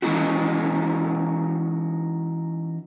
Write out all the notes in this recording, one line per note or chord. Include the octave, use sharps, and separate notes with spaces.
E3 G#3 C#4 D#4 E4 F#4